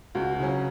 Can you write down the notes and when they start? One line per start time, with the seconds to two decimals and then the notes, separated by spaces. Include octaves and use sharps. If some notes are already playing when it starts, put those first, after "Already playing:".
0.15 C#2 F#4
0.40 C#3 F#3 C#4